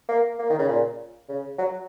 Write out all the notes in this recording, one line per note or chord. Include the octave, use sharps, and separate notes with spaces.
A#3
A#3
D#3
C#3
A#2
C#3
F#3